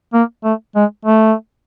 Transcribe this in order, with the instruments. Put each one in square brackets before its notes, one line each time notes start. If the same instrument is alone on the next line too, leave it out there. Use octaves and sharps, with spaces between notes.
[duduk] A#3
A3
G#3
A3